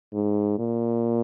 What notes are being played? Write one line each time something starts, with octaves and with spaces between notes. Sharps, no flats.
G#2
A#2